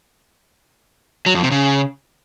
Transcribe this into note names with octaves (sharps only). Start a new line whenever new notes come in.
F#3
F2
C3
C#3